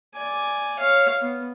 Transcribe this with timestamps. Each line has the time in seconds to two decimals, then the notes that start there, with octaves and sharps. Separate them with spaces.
0.16 D5 G#5
0.79 C#5 F5
1.21 B3